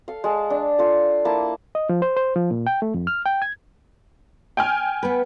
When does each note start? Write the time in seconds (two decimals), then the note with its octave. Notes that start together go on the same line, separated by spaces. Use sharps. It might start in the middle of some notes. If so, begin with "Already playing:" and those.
0.08 A4 F5
0.24 G#3 A5
0.50 D4
0.79 F4 A4
1.25 A#3 E4 A5
1.75 D#5
1.89 F3
2.02 C5
2.17 C5
2.36 F3
2.51 A#2
2.67 G5
2.82 A3
2.94 F2
3.07 F6
3.26 G5
3.42 G#6
4.57 G5 G#5 F6
5.03 B3 B4